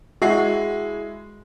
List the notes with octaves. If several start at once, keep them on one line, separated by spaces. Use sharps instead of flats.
G#3 E4 F#4 C7